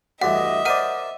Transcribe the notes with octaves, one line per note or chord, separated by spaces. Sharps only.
D2 G2 E3 D#5 E5 F#5
A#4 C5 D5 F#5 D#7